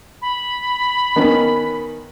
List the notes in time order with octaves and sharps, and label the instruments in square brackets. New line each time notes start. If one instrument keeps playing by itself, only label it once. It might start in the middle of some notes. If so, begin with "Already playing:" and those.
[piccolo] B5
[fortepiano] D#3 B3 C#4